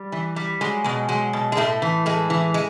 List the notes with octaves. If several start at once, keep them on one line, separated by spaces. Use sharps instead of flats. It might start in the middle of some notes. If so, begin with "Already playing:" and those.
Already playing: G3
E3
G3
F#3 G#3
B2 G#3
F#3 G#3
B2
G#3
A2 A3
E3
A2 G#3
E3
G#3